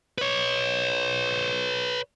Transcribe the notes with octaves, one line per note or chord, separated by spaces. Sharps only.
B4 C#5